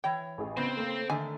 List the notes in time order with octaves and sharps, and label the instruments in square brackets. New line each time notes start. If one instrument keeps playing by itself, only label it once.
[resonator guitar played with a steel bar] E3 C#5 [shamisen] G5
[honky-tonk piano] A1 G#4
[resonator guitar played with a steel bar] C#3 [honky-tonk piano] B3 [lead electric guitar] C4 C5
[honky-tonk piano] A3 A#3
[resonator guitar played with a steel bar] D3 D#3 A3 [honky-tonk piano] A4 E5 [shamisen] G#5